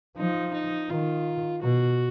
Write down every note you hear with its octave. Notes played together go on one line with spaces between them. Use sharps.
F3 D#4
D#4
D#3 F4
B2 F#4